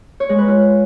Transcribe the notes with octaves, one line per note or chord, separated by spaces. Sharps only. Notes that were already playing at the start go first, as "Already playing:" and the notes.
C#5
G#3
B4
F4